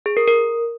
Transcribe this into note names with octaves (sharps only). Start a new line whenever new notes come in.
G#4
A#4
A#4